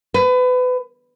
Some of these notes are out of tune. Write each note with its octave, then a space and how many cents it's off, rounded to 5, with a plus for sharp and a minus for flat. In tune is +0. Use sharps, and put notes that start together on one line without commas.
B4 +30